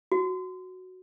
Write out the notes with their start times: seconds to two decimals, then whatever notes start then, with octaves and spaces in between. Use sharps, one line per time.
0.12 F#4